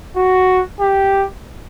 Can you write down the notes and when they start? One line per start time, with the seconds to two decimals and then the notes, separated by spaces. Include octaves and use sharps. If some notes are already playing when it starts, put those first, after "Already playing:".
0.16 F#4
0.80 G4